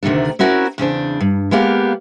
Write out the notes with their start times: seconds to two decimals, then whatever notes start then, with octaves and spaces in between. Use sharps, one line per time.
0.03 D2 C3 D#3 A3 D4
0.39 C4 C#4 E4 F#4 A#4
0.78 E2 C#3 C4 D4
1.21 G2
1.51 G#3 A#3 B3 G4 F5